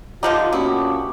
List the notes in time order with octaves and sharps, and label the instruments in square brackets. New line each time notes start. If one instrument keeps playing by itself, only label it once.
[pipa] D3 F3 D#4 [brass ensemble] F4 [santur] G4 A#5
[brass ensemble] A#2 C#4 F#4 [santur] B3 D4 C#6 [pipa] E4